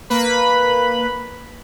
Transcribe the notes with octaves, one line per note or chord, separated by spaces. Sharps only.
A#3 B4 B5